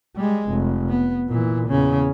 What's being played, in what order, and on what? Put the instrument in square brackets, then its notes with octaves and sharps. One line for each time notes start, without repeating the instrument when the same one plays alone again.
[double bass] G3 G#3
F1
B3
A#2 E3
E2 C#3